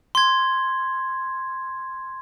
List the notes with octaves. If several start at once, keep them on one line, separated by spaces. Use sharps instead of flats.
C6 G#6